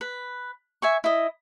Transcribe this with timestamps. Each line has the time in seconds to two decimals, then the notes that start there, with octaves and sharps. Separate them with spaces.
0.01 B4
0.82 E5 G#5 C#6
1.04 E4 D#5